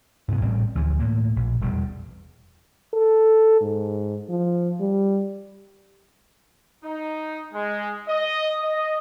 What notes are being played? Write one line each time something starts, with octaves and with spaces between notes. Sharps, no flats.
G2 C3 B3
A1 A2 G3 C4
D2 E3 F3
A2 A#3
A#1
E1 G3
A4
G#2
F3
G3
D#4
G#3
D#5
D#5